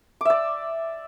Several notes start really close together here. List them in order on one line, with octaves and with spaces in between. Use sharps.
D6 E5 D5